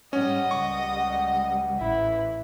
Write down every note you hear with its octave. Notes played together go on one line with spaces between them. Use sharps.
G#2 G3 C#4 D#5 F#5
C#2 G3 C#6
A1 E3 E4